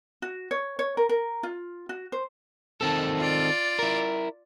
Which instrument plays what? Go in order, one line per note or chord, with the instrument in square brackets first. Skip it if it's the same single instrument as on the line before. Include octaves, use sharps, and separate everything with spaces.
[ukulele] F#4
C#5
C#5
A#4
A#4
F4
F#4
C5
[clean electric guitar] D#3 C4 A4 [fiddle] A5
[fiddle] F4 D5
[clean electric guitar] E4 A#4